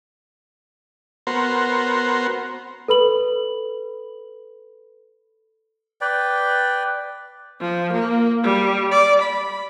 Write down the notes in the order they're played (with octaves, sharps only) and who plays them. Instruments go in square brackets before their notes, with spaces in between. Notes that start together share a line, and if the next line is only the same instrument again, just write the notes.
[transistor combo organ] B3 F#4 A#4 C5
[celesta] A4 B4 B5 F#7
[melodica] B4 D5 G5
[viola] F3
A#3
G3
D5
B5